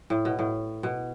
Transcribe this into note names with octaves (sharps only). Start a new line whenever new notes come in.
A2
B2
A2
B2